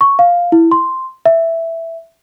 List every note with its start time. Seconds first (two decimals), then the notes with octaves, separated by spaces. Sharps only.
0.01 C#6
0.19 F5
0.52 E4
0.71 C6
1.26 E5